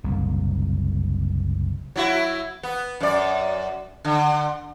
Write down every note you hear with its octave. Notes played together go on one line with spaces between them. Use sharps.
F#1 C2 A#2
F#3 E4 F#4
B3
F#2 D5
D3